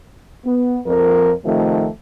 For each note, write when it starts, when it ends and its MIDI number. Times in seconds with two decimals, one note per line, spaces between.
0.44 0.79 59
0.86 1.31 41
0.86 1.31 53
0.86 1.31 70
1.45 1.88 48
1.45 1.88 51
1.45 1.88 53
1.45 1.88 57